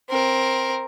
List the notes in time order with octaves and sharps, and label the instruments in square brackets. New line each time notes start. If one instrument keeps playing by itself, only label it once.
[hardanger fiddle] C4 A#4